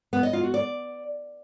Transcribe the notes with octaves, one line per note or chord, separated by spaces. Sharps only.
B3
D#5
F4
F#4
D5